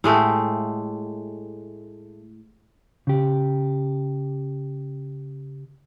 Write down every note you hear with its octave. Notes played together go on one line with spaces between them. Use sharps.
A2 G#3 A3 G4
C#3 G4